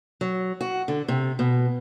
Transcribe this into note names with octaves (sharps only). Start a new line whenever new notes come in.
F#3
F#4
D3
C3
B2